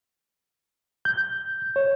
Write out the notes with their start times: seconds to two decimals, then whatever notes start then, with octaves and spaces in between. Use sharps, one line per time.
1.05 G6
1.76 C#5